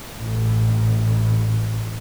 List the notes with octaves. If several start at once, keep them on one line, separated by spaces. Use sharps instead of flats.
A1 A2